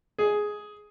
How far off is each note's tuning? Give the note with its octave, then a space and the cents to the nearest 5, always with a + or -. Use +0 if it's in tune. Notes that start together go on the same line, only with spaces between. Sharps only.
G#4 +5